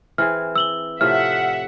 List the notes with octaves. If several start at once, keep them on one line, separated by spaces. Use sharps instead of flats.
E3 C4 G#4 F6
E6 F#7 G7
A2 C3 F3 E5 F#5 F6